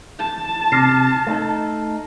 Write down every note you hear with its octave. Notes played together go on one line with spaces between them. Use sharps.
A5
C3 F6 A#6 C7
A3 D#4 A4